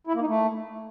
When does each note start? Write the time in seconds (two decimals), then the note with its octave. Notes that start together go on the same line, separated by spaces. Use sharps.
0.07 E4
0.14 A#3
0.21 D#4
0.28 A3